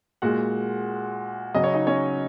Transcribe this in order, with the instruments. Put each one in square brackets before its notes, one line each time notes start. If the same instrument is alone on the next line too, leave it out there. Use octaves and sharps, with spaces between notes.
[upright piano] A#2 G#3 F#4 F#5
C#3 F#3 D#5
C#5
D#4 D#5
C#4 C#5